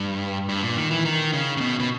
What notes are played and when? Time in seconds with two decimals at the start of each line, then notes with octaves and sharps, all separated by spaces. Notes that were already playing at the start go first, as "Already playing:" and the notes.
Already playing: G2
0.49 G2
0.63 A#2
0.77 D#3
0.91 E3
1.05 D#3
1.33 C#3
1.57 C#3
1.61 B2
1.80 B2